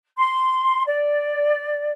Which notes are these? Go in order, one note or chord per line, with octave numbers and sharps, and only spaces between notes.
C6
D5